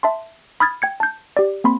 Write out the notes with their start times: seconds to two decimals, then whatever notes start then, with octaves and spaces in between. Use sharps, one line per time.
0.03 E5 A5 C6
0.60 B5 D#6 F6 G#6 A6
0.82 G5 G#6 C#7
1.00 A5 G6
1.37 G4 D5
1.64 A#3 C4 B5 C6